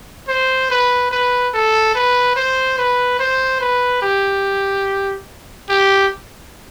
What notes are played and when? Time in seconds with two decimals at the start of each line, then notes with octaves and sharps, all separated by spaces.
0.28 C5
0.70 B4
1.11 B4
1.54 A4
1.95 B4
2.36 C5
2.78 B4
3.19 C5
3.60 B4
4.02 G4
5.69 G4